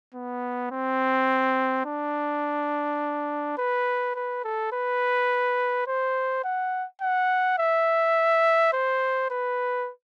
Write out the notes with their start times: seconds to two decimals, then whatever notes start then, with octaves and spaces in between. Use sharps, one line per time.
0.14 B3
0.71 C4
1.85 D4
3.58 B4
4.15 B4
4.44 A4
4.73 B4
5.87 C5
6.44 F#5
7.01 F#5
7.59 E5
8.73 C5
9.30 B4